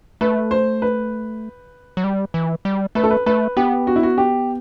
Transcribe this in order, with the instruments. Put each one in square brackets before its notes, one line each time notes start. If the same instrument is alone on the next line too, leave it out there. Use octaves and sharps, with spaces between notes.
[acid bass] A3 [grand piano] B4
[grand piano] C5
B4
[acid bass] F#3
G3
E3
G3
[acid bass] A3 [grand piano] B4
[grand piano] A4
B4
[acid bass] A3 [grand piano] B4
[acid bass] B3 [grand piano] G4
[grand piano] F#4
E4
F#4
G4